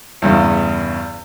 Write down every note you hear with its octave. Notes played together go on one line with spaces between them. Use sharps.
E2 G2 C#3